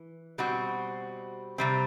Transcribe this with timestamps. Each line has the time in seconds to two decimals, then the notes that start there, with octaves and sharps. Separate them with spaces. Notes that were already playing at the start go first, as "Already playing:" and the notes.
Already playing: E3
0.38 B2 G3 C4 F#4
1.58 C3 G3 C4